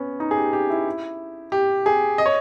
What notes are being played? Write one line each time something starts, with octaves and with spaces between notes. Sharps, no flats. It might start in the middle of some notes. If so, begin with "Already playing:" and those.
Already playing: B3 C#4
D#4
G#4
G4
G4
E4
G4
G#4
D#5
C#5